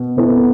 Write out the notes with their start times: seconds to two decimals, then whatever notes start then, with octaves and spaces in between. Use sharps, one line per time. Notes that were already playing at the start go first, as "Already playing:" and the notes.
Already playing: B2 B3
0.17 B2 B3 E4 A4